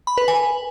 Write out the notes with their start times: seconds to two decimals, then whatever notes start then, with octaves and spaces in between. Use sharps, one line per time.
0.07 B5
0.18 B4
0.28 G#5